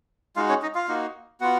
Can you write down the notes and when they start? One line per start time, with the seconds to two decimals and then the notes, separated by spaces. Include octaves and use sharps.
0.36 G#3 D#4 F4 F#4 F5
0.49 C#4 C#5
0.62 D#4 D#5
0.75 F4 F5
0.88 A#3 D#4 F#4
1.41 B3 F4 F#4 F#5